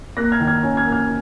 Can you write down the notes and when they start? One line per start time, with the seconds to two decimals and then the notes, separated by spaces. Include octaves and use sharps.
0.17 A#3 F#6 A#6
0.32 F6 G#6
0.40 D#3
0.47 F6 G#6
0.63 C#4
0.77 F6 G#6
0.85 A#3
0.92 F6 G#6